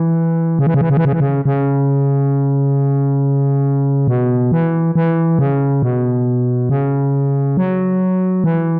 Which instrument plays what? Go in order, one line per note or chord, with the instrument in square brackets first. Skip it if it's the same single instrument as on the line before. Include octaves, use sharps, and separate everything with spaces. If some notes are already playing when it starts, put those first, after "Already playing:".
Already playing: [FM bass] E3
C#3
E3
C#3
E3
C#3
E3
C#3
E3
C#3
C#3
B2
E3
E3
C#3
B2
C#3
F#3
E3